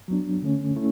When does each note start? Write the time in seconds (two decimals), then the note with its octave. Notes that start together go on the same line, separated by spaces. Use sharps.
0.08 F#3 B3 D4
0.42 D3 A3 C#4
0.76 A3 C#4 E4